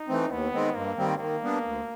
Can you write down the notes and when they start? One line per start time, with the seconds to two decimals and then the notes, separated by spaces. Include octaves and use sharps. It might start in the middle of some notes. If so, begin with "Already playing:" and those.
Already playing: D#4
0.08 E3 A3 C4
0.30 D#2 B3
0.52 D#3 G#3 C4
0.75 G2 A#3
0.97 D#3 G3 C4
1.18 D#3 A#3
1.41 G3 B3 D4
1.63 D2